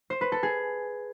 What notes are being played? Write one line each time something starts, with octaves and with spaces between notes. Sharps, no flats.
C5
B4
A4
G#4